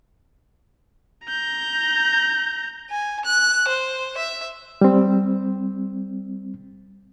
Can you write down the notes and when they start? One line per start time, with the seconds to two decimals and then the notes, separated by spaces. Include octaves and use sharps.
1.26 A#5 G6
2.90 G#5
3.25 F#6
3.68 C5
4.17 E5
4.81 G3 C4